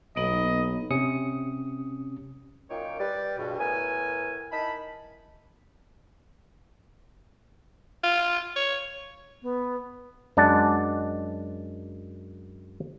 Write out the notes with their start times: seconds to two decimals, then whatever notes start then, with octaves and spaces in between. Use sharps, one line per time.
0.16 B1 A#3 B3 D#4 D#5
0.90 C3 C#4 D#6 C#7
2.70 F#2 A#2 D#4 F4 C#5 G5
2.99 G3 B4 D5
3.37 C#2 G2 B2
3.59 A2 B3 A#4 G#5
4.51 D#4 E4 A#4 A5 B5
8.04 F4
8.56 C#5
9.42 B3
10.37 F#2 G#3 D4 D5 F#5 A5